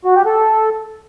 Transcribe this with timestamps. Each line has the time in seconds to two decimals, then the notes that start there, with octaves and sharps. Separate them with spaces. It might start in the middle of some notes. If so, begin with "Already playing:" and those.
0.05 F#4
0.15 G4
0.26 A4